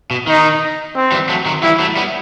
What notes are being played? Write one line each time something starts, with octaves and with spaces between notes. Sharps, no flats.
B2
D#3 D#4
C4
E3 G3
F#3 A3
D#3 F#3
E3 G3 E4
F#3 A3
G3 B3